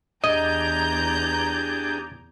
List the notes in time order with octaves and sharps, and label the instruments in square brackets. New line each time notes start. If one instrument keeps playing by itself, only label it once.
[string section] E2 A#5 G6 [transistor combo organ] D4 G4 G#4 [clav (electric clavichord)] D#5